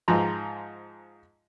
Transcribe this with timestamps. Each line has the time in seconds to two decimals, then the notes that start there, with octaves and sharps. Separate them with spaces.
0.08 G#2 F3 A#5 C6